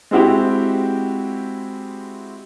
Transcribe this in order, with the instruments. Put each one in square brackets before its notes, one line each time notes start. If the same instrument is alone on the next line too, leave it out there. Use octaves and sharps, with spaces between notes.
[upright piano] G#3 C4 E4 F#4 G4